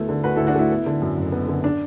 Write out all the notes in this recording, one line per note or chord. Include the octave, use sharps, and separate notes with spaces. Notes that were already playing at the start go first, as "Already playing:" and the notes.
Already playing: D2 A3 B3 E4 A4
D3
D2 F#4 B4
D2 E4 A4
D4 F#4
A3 E4
B3
D3
F#2
F#1
B3
D3
D4